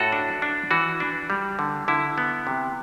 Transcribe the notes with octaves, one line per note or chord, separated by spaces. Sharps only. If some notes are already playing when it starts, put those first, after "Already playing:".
Already playing: A2 F#4 A4
D4
D4
E3 F#4
D4
G3
D3
D3 E4
B3
C3